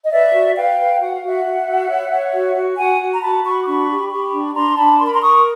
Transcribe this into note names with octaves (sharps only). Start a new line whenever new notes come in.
D#5
B4 D5 E5
F#4
B4 F5 G5
B4
F#4 F#5
F5
F#4 E5 F#5
F#4
F#4
C#5
C#5
F#4
F#4
F#4 F#5 G#5
F#4
A#5
F#4 A5 B5
F#4 B5 C#6
D6
D4 B5 C#6
G4
G4 B5 C#6
D4
D4 A#5 C6
D4 A5 B5
A#4 C6
B5
A#5 C6
A#4 C#6 D#6